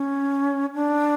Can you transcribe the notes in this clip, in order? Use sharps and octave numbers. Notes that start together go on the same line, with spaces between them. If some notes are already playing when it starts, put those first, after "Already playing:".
Already playing: C#4
D4